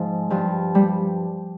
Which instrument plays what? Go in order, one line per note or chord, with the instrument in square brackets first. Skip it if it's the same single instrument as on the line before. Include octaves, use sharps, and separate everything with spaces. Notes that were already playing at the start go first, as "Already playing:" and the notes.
Already playing: [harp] G#2 F3
G2 F3
G3